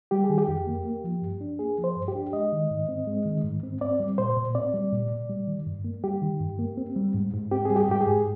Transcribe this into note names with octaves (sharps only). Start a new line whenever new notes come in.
G3 G4
G#4
D#3
G4
F2
A#3
A#3
F3
G2
D4
A#3 G#4
F3
C5
G2
G4
D4
G#3 D#5
D#3
G#2
C4
G#3
D#3
G#2
C4
C4 D5
G3
A#2 C5
A#2
C4 D5
G3
A#2
A#2
G3
D#3
G2
A#3
G3 G4
D#3
G2
A#3
C4
G3
G#2
G#2
C4 G4
G3 G#4
G4
G#2 G4
G#4
G#2